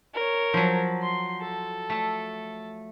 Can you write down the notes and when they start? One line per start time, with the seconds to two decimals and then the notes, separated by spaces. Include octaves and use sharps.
0.14 A#4 C#5
0.54 F3 F#3
1.02 C6
1.41 A4
1.90 A3 A5